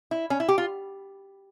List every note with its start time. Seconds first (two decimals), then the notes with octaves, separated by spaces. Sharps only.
0.11 E4
0.30 C#4
0.40 E4
0.48 G4
0.58 F4